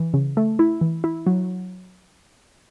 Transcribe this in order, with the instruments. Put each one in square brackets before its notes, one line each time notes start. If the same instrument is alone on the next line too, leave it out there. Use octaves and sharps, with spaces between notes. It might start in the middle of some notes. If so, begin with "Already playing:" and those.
Already playing: [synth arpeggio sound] E3
C#3
A3
E4
E3
E4
F#3